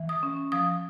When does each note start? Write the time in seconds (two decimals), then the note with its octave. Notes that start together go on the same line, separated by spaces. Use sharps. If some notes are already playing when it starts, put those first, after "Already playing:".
Already playing: E3
0.09 D#6
0.23 C#4
0.52 F3 D#6